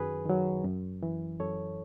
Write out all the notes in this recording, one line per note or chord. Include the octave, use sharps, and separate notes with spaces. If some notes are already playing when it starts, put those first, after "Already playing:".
Already playing: F#2 D#3 F#3 G#4 B4
D#3 F#3
F#2
E3
F#2 A4 C#5